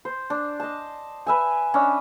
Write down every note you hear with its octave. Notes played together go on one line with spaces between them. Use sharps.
C5
D4
D#5 A5
B4 E5 G#5
C#4 D4 D#5 E5